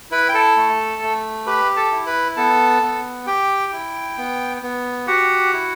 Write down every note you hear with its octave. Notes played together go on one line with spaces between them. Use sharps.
E4 B4 B5
G5
A4 A5
A3
A3
G4 B4 B5
A4 A5
E4
B4 B5
B3 A4 A5
B3
G4 G5
E4
B3
B3
F#4 G4 F#5
E4